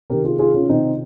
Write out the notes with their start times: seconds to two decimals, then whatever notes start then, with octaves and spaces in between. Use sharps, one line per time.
0.10 C3 D#3 G4 A#4
0.25 F4 G#4
0.39 F4 G#4
0.54 C#4 F4
0.69 C3 D#3 C4 D#4